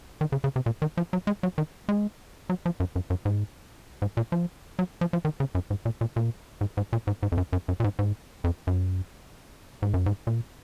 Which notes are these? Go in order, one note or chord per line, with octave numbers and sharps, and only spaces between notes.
D#3
C#3
C#3
C3
A#2
D#3
F3
F#3
G#3
F#3
D#3
G#3
F#3
F3
F#2
F#2
F#2
G#2
G#2
A#2
F3
F#3
F3
F3
D#3
C#3
F#2
G#2
A#2
A#2
A#2
G#2
G#2
A#2
G#2
G#2
F2
F#2
F#2
F#2
A#2
G#2
G#2
F2
F#2
G#2
F#2
G#2
A#2